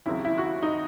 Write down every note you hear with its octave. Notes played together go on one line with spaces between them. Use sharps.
D#2 C#3 F#3 C4 E4
E4
F#4
E4
D#4